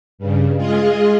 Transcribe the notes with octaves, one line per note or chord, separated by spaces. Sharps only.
G2 C#3
G#3 F4 G#4 D#5